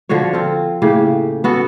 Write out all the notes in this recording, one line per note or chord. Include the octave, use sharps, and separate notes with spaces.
D3 F3 F#4 C#5
C4 F4
A2 C#3 A#3 G4
B3 F#4 A4